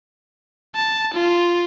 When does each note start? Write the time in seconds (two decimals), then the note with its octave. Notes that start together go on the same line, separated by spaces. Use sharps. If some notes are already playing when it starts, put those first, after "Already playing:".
0.76 A5
1.13 F4